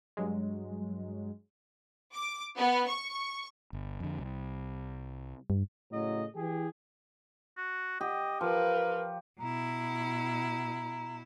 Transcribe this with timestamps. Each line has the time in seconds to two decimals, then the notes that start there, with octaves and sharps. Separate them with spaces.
0.17 G2 F#3 G#3
2.14 D6
2.58 B3
2.87 C#6
3.73 G1
4.00 F2 D3
4.18 C2
5.50 G2
5.92 A2 C#3 F#3 D#5
6.35 E3 E4 G4 G#4
7.58 F#4
8.01 G4 D#5
8.41 F3 A#4 B4 F5
9.40 B2 E4 A#5